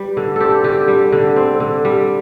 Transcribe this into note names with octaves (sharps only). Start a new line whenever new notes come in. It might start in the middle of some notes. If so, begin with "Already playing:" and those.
Already playing: G3 B4
D3
C4 G4 A4
D3 G4
G3
D3
C4
D3
G3